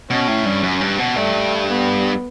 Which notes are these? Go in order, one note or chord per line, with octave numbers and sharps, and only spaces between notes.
B2 C#4
A2
G2
F#2
G2
B2
G2 A3
B3